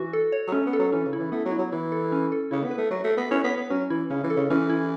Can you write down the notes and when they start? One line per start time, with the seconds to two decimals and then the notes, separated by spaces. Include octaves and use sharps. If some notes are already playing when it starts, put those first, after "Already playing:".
Already playing: E3 F#4
0.13 A4
0.32 C#5
0.48 F#3
0.52 A3 C#4
0.66 B3
0.73 A4
0.79 F#3
0.92 E3 C#4
1.06 C#3
1.13 E4
1.19 E3
1.32 A3 B3
1.45 F#3
1.52 E4
1.58 F#3
1.72 E3 E4
1.92 A4
2.12 C#4
2.32 A4
2.51 C#3 E4
2.64 B3
2.71 B4
2.78 A3
2.91 F#3 F#4
3.04 A3
3.10 A4
3.17 B3
3.31 C#4 E4
3.44 B3
3.50 C#5
3.57 B3
3.70 F#3 C#4
3.90 E3 E4
4.10 C#3 C#4
4.23 E3
4.30 A4
4.36 C#3
4.50 E3 C#4
4.70 E4